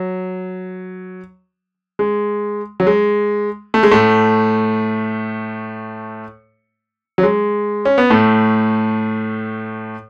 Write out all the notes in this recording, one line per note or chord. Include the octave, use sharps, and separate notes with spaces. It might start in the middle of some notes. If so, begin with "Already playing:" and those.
Already playing: F#3
G#3
F#3
G#3
A3
G#3
A2 A3
F#3
G#3
C#4
B3
A2 A3